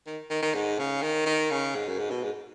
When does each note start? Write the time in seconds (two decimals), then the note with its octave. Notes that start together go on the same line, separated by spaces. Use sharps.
0.07 D#3
0.30 D#3
0.42 D#3
0.55 G#2
0.79 C#3
1.02 D#3
1.26 D#3
1.51 C#3
1.75 G#2
1.89 F#2
1.99 G#2
2.11 B2
2.23 G#2